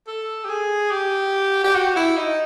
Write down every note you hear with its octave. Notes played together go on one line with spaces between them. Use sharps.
A4
G4
G#4
G4
G4
F#4
E4
D#4